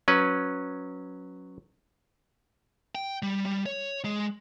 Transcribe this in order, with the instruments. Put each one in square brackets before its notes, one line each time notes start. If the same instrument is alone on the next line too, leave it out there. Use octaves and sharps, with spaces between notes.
[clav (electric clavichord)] F#3 C#4 B4
[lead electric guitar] G5
G3
G3
C#5
G#3